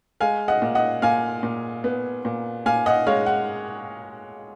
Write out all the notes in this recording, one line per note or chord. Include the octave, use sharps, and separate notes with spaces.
G#3 F5 G#5
D#5 F#5
A#2
D#5 F#5
A#2 F5 G#5
A#2
B3
A#2
A#2 F5 G#5
D#5 F#5
G#3 C#5 F5
F#5